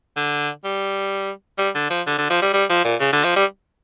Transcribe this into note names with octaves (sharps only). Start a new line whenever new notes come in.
D3
G3
G3
D3
F3
D3
D3
F3
G3
G3
F3
A#2
C#3
D3
F3
G3